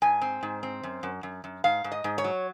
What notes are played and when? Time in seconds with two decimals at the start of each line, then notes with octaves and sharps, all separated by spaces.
0.02 G#2 G#5
0.22 C4
0.43 G#2
0.63 C4
0.83 F#2
1.03 F#2
1.23 F#2
1.44 F#2
1.64 G#2 F5
1.84 G#2
1.92 D#5
2.04 G#2
2.18 C#5
2.24 F#3